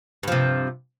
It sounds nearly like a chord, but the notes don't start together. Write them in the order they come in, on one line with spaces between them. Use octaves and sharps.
G2 F3 C3